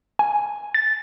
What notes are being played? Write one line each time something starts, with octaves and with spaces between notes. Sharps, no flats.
G#5
A6